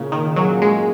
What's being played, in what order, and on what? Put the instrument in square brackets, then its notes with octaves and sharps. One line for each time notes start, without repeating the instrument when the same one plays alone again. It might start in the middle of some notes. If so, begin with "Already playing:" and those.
Already playing: [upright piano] A#2 A#3 C#4 G#4 [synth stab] C#3
[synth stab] D#3
[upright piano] A#2 A#3 C#4 G#4 [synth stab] F#3
[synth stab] G#3